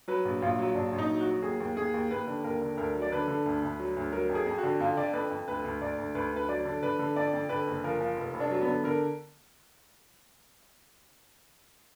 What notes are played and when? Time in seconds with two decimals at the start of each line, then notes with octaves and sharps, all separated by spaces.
0.08 F#3 B4
0.25 A#1
0.42 A#1 F4
0.59 F#3
0.75 A#1 D4
0.93 A#1
0.98 D#4
1.09 F#3
1.21 F#4
1.27 F#3
1.42 D#2 G#4
1.60 D#2
1.77 D#2 G#4
1.94 D#2
2.11 D#2 B4
2.27 D3
2.44 D#2 A#4
2.62 D3
2.77 D2 A#4
2.95 F#3
3.02 D5
3.12 D3 B4
3.28 D3
3.46 D2
3.62 D2
3.79 F#3
3.96 D2
4.12 F#3 A#4
4.30 F2
4.35 G#4
4.47 F2
4.58 F#4
4.63 D3
4.80 F2 F4
4.97 D3 D5
5.14 F2 B4
5.31 F2
5.48 D2 B4
5.64 D2
5.81 D2 D5
5.98 D2
6.15 D2 B4
6.32 D2 B4
6.48 F#3 D5
6.65 D3
6.83 D3 B4
6.99 D3
7.16 F2 D5
7.34 F2
7.49 D3 B4
7.67 F#1
7.84 F3 A#4
8.01 F3
8.17 F1
8.34 F1
8.40 D4
8.51 F#3
8.62 B3
8.68 D3
8.84 D3 A#4